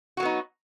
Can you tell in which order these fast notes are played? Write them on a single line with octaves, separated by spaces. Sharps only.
F#4 F#3 B3 D#4